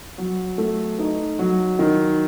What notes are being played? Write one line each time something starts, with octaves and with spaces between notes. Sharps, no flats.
F#3
A3
D#4
F#3
D#3